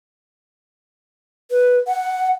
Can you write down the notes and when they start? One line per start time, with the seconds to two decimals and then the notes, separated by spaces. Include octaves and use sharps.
1.51 B4
1.87 F#5